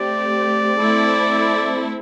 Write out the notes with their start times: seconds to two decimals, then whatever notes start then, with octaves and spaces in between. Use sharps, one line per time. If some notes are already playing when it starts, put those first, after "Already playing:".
Already playing: A3 C4 G4 D5
0.79 A3 C4 E4 A4